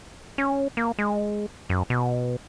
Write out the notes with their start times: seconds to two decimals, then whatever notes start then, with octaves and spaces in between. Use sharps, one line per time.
0.38 C#4
0.77 A#3
0.99 G#3
1.70 F#2
1.90 B2